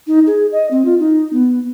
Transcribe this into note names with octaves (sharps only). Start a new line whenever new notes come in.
D#4
G#4
D#5
C4
F4
D#4
B3